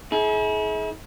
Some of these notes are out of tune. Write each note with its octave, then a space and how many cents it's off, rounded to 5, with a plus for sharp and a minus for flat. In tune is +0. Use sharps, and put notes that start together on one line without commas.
E4 -40 G#4 +35